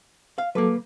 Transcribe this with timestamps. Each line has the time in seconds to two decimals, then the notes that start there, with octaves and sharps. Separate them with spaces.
0.38 F5
0.55 F#3 A#3 A4 B4 D6